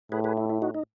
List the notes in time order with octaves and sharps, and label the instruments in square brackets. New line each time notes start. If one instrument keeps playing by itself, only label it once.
[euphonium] A2 [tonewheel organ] G#4 B4
[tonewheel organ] G#4 B4
E4
E4
D#4 F#4
D#4